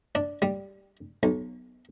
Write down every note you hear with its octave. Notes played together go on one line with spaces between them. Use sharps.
D4
G3
B1